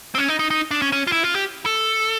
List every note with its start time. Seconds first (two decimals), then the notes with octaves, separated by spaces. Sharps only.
0.15 C4
0.18 C#4
0.28 D#4
0.39 D#4
0.51 D#4
0.71 D4
0.82 C#4
0.92 C#4
1.07 F4
1.12 E4
1.24 F4
1.34 G4
1.66 A4